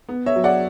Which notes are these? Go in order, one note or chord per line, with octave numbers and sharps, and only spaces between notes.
B3
C#5 E5
F#3
D5 F#5